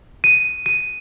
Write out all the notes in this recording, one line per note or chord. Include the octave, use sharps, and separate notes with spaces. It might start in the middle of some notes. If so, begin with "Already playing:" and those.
D#7
D#7